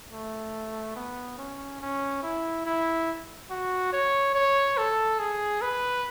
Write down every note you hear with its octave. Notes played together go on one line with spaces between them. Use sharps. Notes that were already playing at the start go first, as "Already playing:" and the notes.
A3
B3
C#4
C#4
E4
E4
F#4
C#5
C#5
A4
G#4
B4